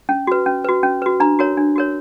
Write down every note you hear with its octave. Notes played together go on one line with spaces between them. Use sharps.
C#4
F#4 B4
C#4
F#4 B4
C#4
F#4 B4
D4 A#5
F#4 A#4 C#5
D4
F#4 A#4 C#5